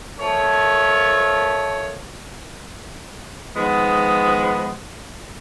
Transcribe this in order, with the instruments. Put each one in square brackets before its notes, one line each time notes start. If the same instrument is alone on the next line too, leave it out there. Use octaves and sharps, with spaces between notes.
[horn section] F3 A3 A#4 C#5
[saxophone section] D#3 F3 G#3 B3